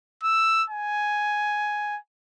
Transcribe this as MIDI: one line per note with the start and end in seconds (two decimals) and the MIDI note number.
0.23 0.65 88
0.70 1.98 80